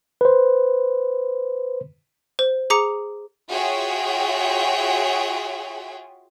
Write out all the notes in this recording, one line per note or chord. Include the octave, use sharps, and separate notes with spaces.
B4 C5
C5
G#4 A#5 D6 C#7
F4 F#4 G#4 C#5 E5 G5